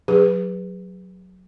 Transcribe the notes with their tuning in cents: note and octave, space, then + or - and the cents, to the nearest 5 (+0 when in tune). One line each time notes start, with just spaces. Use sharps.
F#3 +0 G#4 -30 B4 +0